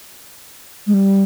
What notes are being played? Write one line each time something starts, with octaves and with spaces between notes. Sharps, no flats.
G#3
G3